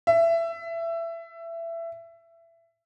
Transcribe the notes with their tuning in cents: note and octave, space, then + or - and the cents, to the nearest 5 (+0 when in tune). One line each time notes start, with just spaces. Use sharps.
E5 +20